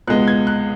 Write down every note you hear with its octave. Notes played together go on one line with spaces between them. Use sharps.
C#2 B2 G#3 B3 F#6
G#6
F#6